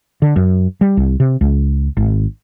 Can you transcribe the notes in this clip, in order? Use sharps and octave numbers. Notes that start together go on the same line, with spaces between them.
D3
F#2
G3
C2
C3
C#2
G#1